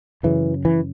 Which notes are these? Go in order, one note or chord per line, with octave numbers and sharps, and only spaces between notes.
F#2 C#3 E3
E3